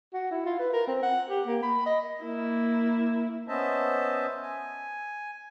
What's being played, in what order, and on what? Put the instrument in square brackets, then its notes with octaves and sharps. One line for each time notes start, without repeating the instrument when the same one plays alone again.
[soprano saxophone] F#4
E4
F4
B4
A#4
C4
F#5
G4
A#3
B5
D#5
[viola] A#3 E4
[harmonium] B3 C#4 C5 D#5 E5 A5
G#5